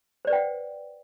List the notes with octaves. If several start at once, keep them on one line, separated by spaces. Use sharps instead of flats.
B4 C5 D5 F#5 G5